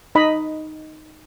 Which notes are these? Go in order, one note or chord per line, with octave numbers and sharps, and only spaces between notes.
D#4 D#5 B5